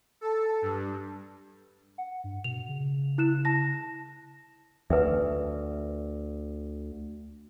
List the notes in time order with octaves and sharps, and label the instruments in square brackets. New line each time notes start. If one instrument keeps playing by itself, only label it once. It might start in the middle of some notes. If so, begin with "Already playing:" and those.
[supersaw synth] A4
G2
[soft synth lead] F#5
G2
[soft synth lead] B2 [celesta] F7
[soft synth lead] C#3
[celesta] E4 F#6 E7
A5 A#6
[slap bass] D2 [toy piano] B4 E5